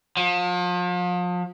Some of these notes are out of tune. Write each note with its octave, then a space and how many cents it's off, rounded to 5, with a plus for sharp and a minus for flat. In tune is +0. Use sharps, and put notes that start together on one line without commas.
F3 +35